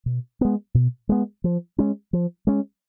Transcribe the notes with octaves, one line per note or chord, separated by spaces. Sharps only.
B2
G#3 B3
B2
G#3 B3
F3
G#3 C#4
F3
G#3 C#4